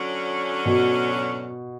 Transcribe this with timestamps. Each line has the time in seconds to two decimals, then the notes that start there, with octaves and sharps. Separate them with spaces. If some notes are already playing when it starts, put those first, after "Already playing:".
Already playing: D3 F#3 C#4
0.66 B2